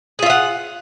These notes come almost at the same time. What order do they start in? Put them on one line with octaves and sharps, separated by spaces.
G#4 F4 E5 F#5